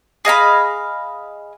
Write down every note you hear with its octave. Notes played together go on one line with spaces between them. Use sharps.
G#4 D#5 F5 B5